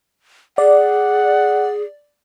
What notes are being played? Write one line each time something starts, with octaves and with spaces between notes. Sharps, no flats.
G#4 D5 F#5